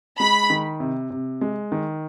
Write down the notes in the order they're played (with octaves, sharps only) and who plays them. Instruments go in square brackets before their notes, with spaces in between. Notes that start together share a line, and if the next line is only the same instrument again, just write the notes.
[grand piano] G#3 [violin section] B5
[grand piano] D#3
C3
C3
G#3
D#3